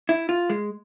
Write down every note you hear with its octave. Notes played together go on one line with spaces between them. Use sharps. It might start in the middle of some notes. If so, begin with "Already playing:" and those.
E4
F4
G#3